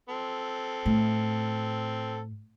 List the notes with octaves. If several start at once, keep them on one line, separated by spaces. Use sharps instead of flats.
C4 A4
A2